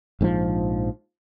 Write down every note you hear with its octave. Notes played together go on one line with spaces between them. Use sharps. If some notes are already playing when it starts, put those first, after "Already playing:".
A#1 G#2 D3 F3